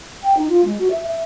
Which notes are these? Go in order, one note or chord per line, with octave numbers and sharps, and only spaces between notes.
G5
D#4
F4
G#3
F#4
E5
E5